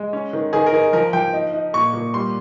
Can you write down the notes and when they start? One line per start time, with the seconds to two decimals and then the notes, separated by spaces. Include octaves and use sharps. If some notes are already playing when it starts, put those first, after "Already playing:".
Already playing: G#3
0.13 C#4
0.33 D#3
0.53 D#3 G#4
0.66 A#4
0.73 D#3 G#4
0.93 F3 A#4
1.13 F3 G5
1.33 D#4
1.53 D#4
1.73 A#2 C#6
1.93 A#2
2.14 G3 C6